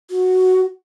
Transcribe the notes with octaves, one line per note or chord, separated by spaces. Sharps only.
F#4